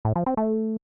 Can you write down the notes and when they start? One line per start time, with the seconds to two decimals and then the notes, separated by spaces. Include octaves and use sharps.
0.05 A2
0.16 F3
0.26 C4
0.37 A3